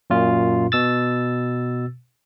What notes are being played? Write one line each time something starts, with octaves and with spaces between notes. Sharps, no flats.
F#2 A#2 F4
B2 E6 A6